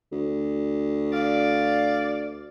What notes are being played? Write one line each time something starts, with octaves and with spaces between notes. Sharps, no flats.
D2
D5 F5